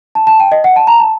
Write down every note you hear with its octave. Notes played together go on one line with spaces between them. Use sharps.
A5
A5
G5
D#5
F#5
A5
A#5
A5